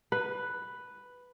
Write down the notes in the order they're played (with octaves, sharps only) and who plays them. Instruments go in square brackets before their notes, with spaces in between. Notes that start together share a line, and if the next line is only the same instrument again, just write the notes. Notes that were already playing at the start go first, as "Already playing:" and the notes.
[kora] B4